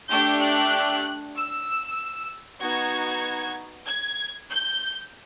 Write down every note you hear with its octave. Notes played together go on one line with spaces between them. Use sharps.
A3 D4 G4 G6
F#6
E6
B3 D#4 F#4 G#6
G#6
G6